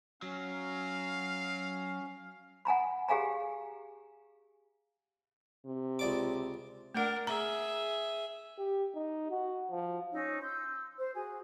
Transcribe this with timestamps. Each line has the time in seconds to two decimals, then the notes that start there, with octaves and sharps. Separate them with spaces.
0.22 F#3 C#4 F5
2.65 F#5 G#5 A#5 B5
3.08 G4 G#4 F5 G#5 A#5
5.66 C3
5.99 C#2 D5 D6
6.94 A3 D4 A#4 F#5
7.27 G#4 E5 A#5
8.58 G4
8.95 D#4
9.31 F#4
9.71 F3
10.12 C#4 D#4 C#5 E6
10.41 C6 E6 G6
10.98 C5
11.13 F#4 G#4